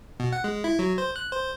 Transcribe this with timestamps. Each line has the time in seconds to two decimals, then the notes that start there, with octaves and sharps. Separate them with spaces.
0.20 B2
0.32 F#5
0.44 G#3
0.64 E4
0.79 F#3
0.98 C5
1.16 F#6
1.32 C5